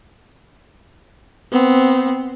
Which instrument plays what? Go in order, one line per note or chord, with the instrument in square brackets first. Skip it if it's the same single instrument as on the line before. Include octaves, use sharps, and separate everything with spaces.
[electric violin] B3 C4